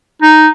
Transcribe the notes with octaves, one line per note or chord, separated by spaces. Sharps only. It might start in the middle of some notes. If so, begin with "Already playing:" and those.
D#4